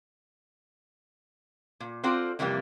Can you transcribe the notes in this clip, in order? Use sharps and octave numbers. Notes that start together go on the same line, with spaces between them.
A#2
C4 F4 F#4 A4 C5 D5
F2 C3 E3 G3 A#3